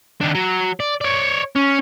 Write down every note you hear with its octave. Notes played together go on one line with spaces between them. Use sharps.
D#3 D4
F#3
D5
C#5 D5
C#4